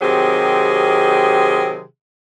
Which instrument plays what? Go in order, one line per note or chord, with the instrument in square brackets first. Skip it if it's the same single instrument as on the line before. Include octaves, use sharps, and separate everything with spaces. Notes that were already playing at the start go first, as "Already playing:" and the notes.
[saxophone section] C3 D#3 F#3 C4 G4 G#4